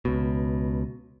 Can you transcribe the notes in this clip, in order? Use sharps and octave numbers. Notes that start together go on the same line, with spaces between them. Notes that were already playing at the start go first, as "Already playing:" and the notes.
C#2 B2